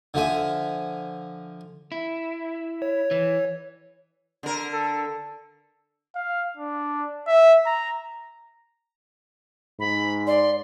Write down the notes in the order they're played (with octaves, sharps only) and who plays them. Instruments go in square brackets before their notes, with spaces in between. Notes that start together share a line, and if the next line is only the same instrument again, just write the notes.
[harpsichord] D3 F3 E5 G#5
[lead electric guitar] E4
[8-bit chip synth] C#5
[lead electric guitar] E3
[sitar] D3 A#4
[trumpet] A4
[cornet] F5
D4
E5
A#5
[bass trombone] G#2 [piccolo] B5
[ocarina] D5 [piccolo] C6